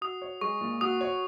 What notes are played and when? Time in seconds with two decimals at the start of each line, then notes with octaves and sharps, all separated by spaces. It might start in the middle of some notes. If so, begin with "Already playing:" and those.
0.01 F#4 D#6
0.22 C#5
0.41 G#3 C#6
0.61 A#2
0.81 F#4 D#6
1.01 C#5